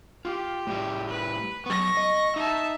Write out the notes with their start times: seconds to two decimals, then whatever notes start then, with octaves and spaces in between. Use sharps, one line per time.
0.25 F4 G4
0.67 A2 G3
1.09 B4
1.66 F#3 B3 C#6 A#6
1.97 D#5
2.36 D#4 E5 A5